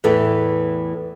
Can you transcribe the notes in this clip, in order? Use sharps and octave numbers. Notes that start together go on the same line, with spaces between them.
E2 A2 E3 A4 B4